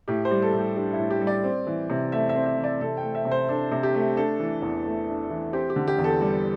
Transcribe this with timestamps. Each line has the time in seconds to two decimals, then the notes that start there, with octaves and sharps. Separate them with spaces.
0.08 A2 G4
0.25 C5
0.31 G3
0.42 A4
0.53 A2
0.59 G4
0.76 D4 G4
0.93 E4
0.99 A2
1.10 G4
1.21 G3
1.27 D5
1.44 C4
1.67 E3
1.90 C3
2.12 A3 E5
2.29 E5
2.35 C4
2.46 E5
2.58 E3
2.64 D5
2.81 C3 A4
2.97 G5
3.03 A3
3.15 E5
3.25 C3
3.31 C5
3.49 D4 A4
3.72 C3
3.83 G4
3.94 A3
4.17 D4 A4
4.40 E3
4.62 E2
4.85 A3
5.08 D4
5.30 E3
5.53 C4 G4
5.70 G4
5.76 D3
5.88 G4
5.99 E2
6.04 A4
6.21 G3